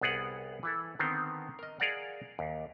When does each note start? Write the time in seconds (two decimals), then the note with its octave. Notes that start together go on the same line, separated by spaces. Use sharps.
0.01 C2 B3 G#4 A#4 F#5
0.63 E3 E4 A4
0.99 D3 D#3 B3 C4
1.59 A#4 D#5
1.80 G#4 A#4 D5 F5 F#5
2.39 D#2